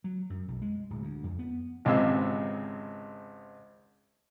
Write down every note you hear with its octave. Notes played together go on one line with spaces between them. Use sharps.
F#3
F#2
B1
G#3
D1
D2
F2
B3
G#1 C#2 C3 G#3 F5 E6